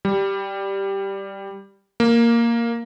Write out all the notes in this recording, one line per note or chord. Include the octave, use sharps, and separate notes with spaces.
G3
A#3